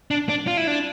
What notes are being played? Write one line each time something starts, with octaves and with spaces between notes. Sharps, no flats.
D4
D4
F4
E4
D4